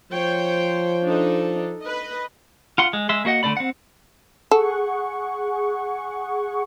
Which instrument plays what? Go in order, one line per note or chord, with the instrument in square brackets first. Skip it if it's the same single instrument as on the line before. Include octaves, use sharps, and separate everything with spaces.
[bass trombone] F3 [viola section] C5 C#5 G5
[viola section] D4 D#4 A4
B4 D#5
[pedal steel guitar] F4 F#5 C6
G#3
G#3 E5 C6
A#3 F#4 D#5 F#5
D3 A3 C4 D5 B5
C4 F#5
[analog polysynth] G#4 F#5 C#6 [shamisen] A4